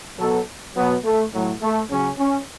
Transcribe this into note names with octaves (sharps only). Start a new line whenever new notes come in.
B2 F#3 A4
B2 F#3 B3
A3
A2 F#3
A3
C#3 F#3 C#4
C#4